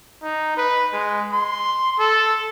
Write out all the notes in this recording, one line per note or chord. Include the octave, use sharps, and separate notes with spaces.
D#4
B4
G#3
C6
A4